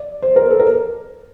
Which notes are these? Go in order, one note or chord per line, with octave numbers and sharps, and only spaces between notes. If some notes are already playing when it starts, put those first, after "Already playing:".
Already playing: D5
C5
A#4
A4
A#4